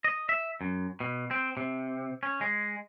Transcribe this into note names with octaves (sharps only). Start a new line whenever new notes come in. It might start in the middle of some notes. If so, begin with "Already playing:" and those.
D#5
E5
F#2
B2
C4
C3
C#4
G#3